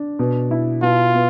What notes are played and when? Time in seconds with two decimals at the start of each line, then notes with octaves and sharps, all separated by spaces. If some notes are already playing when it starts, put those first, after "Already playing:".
Already playing: D4
0.19 B2
0.51 E4
0.82 B2 F4
1.14 B3